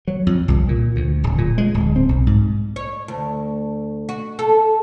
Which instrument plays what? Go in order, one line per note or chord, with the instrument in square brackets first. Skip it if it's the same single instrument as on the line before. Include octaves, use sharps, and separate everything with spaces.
[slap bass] F#3
F2
C2
A#2
D2
D1
A#2
G#3
D1
C4
B1
G#2
[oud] C#5
D2
F#4
A4